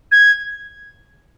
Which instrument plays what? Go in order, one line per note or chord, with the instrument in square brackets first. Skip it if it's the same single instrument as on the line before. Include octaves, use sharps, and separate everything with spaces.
[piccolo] G#6